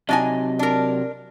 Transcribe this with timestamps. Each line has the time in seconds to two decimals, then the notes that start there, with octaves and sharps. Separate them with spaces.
0.09 C3 F#3 D4 D#4 D#5 G#5
0.59 D4 A#4